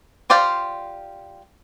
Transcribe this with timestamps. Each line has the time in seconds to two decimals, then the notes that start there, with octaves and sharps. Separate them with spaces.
0.30 F4 G4 C5 D5 F5